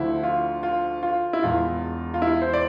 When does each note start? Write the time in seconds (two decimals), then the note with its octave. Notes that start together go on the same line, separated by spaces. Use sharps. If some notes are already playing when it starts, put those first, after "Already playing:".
Already playing: D2 D3 F3 E4
0.24 F4
0.63 F4
1.03 F4
1.33 E4
1.43 E1 E2 E3 F4
2.14 F4
2.22 E4
2.41 C5
2.53 D5